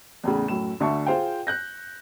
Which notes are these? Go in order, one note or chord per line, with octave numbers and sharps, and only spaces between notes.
E2 A2 C#3
F#2 A2 E7
D2 D3 E5 A5 C#6
F4 G#4 C5 F5 G5
F#6 G6 A#6